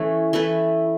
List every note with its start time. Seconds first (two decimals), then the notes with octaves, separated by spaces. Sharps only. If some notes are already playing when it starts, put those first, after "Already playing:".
Already playing: E3 A3 C#4 E4
0.33 E3 A3 E4 B4